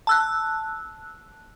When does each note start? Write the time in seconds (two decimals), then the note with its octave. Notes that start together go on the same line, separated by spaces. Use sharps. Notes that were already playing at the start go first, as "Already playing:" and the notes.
0.07 A5 E6 F#6